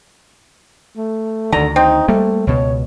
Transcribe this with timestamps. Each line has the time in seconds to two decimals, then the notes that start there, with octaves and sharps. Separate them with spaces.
0.97 A3
1.52 D2 D3 D#3 A#5
1.76 C4 D#4
2.08 G3 A3 A#3
2.47 C#2 B2 C#5